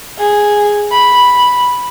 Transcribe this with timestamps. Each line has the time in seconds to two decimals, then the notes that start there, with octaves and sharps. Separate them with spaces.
0.19 G#4
0.92 B5